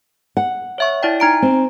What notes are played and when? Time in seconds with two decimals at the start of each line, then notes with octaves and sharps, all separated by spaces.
0.37 F#5
0.78 C#5 E5 C#6
1.03 E4 D5 G5
1.20 D#4 A#5 D7
1.42 C4